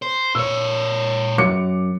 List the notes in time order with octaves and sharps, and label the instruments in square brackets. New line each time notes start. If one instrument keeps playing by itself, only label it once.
[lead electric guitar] C5
[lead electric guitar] A#2 C#5 [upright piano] E6
[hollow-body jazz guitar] F#2 [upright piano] D6 C#7